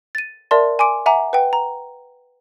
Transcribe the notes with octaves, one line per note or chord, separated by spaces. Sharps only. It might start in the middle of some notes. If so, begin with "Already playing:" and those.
A6 D#7
A#4 D5 E5 A5 C6
G#5 C6 D6 D7
E5 F#5 G#5 A#5 D6
B4 F#5 G5
A#5